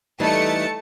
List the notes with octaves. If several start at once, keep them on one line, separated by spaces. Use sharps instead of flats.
E3 G3 A3 D#4 A5 C#7